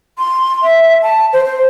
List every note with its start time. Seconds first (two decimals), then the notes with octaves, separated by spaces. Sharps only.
0.18 C6
0.62 E5
1.02 A5
1.33 C5
1.46 C5